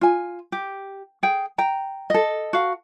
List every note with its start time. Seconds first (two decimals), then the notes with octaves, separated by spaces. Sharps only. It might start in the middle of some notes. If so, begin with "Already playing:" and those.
0.01 F4 G#5
0.52 G4
1.23 G#4 G5
1.58 G5 A#5
2.10 A4 D#5
2.53 F#4 F5